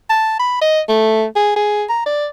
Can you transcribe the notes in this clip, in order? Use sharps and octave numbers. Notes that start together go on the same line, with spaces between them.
A5
B5
D#5
A3
G#4
G#4
A#5
D5